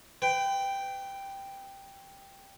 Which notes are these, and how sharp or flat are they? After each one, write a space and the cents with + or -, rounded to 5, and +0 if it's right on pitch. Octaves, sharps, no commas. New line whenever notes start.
B4 +40 G5 +0